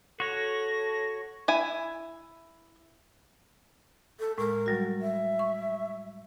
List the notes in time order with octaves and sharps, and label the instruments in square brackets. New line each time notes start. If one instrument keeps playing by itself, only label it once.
[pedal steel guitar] F#4 C#5 [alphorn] A4 [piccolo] A#6
[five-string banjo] E4 G#5
[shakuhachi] A4
[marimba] A2 G#3 [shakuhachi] A#4
[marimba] F#3 G3 F#4
[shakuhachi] E5
[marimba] C#6